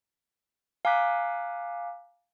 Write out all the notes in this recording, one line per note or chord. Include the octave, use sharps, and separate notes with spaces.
F5 G#5 A#5 D6 F#6 B6